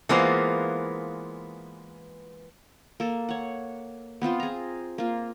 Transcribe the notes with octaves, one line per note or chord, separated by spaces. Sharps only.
E3 G#3 A#3 B3 F4 C5
A#3 A4
C#5 F#5
B3 C4 F4 C5
G#4 A#5
A#3 F4